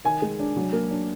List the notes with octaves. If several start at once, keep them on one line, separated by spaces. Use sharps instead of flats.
D#3 G#5
G#3
D4
F#3
A#3
D4